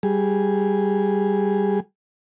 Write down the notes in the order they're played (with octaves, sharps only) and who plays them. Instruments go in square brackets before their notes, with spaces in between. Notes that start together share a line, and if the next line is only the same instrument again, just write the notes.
[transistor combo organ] G3 G#4